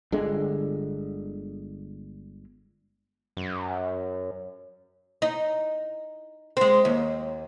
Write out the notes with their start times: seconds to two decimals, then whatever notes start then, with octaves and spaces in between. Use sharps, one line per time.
0.12 G1 D3 G#3
3.37 F#2
5.22 D#4
6.57 G#3 C4
6.85 D#2